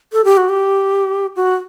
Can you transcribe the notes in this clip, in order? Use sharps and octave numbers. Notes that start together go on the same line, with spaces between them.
A4
G4
F#4
G4
F#4